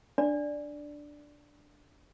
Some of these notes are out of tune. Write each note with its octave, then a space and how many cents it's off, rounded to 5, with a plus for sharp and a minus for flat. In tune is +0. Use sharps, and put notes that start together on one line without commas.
D4 +0 D5 +0